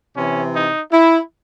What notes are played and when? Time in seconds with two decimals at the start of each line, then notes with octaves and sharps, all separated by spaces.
0.15 C3 E3 C#4
0.53 D#4
0.91 E4